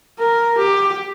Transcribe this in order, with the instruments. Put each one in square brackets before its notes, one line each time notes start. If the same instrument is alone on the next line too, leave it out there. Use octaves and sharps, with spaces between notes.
[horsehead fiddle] A#4
G4